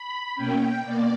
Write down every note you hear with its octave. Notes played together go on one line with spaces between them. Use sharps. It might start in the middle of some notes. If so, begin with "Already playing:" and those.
Already playing: B5
B2 A#3 C#4 G5
B2 A#3 D5